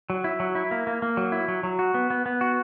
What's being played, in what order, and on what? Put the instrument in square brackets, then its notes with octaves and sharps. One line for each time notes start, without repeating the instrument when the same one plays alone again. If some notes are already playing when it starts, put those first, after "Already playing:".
[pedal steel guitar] F#3
E4
F#3
E4
A#3
A#3
A#3
F#3
E4
F#3
F#3
F#4
B3
B3
B3
F#4